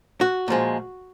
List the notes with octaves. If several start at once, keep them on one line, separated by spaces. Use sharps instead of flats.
F#4
A#2 F3 G#3